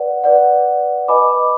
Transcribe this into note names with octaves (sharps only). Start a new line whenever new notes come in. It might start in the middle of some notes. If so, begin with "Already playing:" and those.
Already playing: B4 D5 F#5
B4 D5 F#5
B4 D#5 G#5 B5 D6